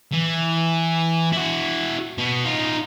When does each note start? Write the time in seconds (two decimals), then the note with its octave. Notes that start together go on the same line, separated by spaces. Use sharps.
0.12 E3
1.33 E4 F#4
2.18 B2 B3
2.46 D#4 F4